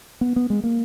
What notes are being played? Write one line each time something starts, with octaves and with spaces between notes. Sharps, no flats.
B3
B3
G#3
A#3